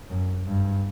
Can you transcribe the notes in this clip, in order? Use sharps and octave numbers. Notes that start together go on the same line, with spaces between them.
F#2
G2